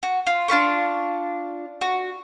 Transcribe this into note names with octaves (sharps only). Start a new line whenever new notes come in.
F#4
F4
D4 F4 B4 C#6
F#4